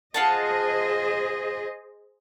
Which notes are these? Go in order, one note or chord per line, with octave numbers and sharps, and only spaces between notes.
F4 G#4 C5 D#5 F#5 A5